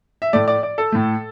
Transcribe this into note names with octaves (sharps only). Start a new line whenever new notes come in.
E5
A2 A3 D5
D5
D5
A4
A2 A3